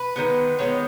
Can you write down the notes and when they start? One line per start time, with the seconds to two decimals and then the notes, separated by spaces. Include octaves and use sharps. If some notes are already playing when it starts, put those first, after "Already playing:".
Already playing: B4
0.16 D#3 G#3 B3
0.59 D#3 G#3 B3 C#5